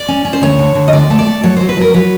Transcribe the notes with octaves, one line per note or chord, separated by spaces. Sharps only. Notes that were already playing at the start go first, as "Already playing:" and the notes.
Already playing: D5
C#4
C#4
C5
D2 C#5
D3
D3
D#5
D2 D5
A3
D5
A3
F#3 C#5
F#3 C5
B4
F#3 A#4
F#3 B4